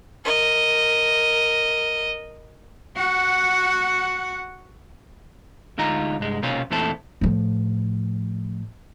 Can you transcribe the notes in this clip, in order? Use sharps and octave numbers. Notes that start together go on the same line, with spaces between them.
A#4 D#5
F#4 F#5
D2 G#3 D#4 F4 A#5
C2 G2 G#3
B1 C3 A#3 C4 C#4 F4
E2 A#2 A3 C4 E4 A4
A2 F3